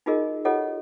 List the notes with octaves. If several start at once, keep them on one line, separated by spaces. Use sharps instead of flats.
D#4 F4 F#4 G#4 A#4 D#5
F4 G4 A4 C#5 D#5 F#5